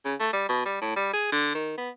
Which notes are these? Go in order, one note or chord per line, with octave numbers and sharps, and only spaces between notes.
C#3
A3
G3
B2
G3
A2
G3
G#4
D3
D#3
B3